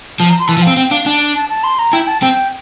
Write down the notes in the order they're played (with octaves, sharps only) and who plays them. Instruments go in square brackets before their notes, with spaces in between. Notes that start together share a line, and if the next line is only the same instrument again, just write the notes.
[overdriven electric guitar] F3 [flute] A5
[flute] A#5
C6
[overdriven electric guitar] E3 [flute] A5
[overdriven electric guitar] F3
[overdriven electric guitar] C4 [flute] F5
[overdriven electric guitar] C4 [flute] G5
[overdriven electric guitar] D4 [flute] F5
[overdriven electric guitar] D4 [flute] A5
[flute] A5
A5
C6
A#5
[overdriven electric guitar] E4 [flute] G5
[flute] A5
[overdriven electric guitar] C4 [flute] G5